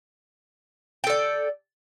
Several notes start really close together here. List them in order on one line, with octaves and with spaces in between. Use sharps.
G5 A4 D5